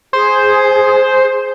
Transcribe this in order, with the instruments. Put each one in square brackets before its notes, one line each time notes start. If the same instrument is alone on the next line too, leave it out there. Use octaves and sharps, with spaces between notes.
[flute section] G#4 [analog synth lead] C5